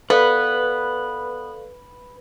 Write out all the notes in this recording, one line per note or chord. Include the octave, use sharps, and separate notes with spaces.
B3 A4 B4 D5 F5